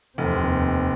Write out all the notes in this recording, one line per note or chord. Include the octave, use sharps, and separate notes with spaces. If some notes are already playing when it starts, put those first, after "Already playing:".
F1 D#2 C4